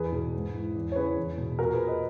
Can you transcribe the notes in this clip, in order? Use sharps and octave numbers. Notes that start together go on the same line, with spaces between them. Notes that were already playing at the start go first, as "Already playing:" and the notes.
Already playing: E2 G#4 B4
B2
G#2
E3
E2
C#5
C#3 E3 G#4 B4
E2
B2
A#2 F#4 A#4
G#4 B4
B4 D#5